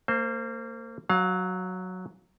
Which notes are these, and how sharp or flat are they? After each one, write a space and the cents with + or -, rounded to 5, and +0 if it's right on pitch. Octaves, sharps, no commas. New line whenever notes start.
A#3 -30 C5 +0
F#3 +0 F5 +30